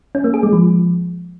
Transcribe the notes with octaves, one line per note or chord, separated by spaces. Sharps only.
C#4
A#3
G#4
G#3
F3